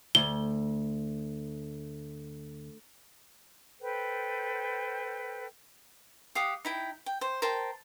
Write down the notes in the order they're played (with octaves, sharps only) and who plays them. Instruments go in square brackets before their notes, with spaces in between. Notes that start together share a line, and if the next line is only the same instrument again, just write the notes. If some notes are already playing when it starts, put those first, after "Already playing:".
[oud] D2 [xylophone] G7
[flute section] A4 B4 C5 G5
[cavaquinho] G4 F5 F#5 D#6
D#4 E4 G5
G5
C5
A#4 C5 G5 A5